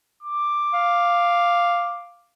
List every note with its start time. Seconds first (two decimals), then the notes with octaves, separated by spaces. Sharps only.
0.23 D6
0.74 F5